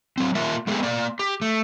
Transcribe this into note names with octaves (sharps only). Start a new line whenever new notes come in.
F#3 C4
A#3 F4 A#4 E5
G#3 A3 B3 G4 G#4
A#3 D5
G4
A3